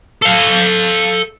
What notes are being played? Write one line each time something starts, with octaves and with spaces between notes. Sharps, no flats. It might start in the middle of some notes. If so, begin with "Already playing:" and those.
A4 F5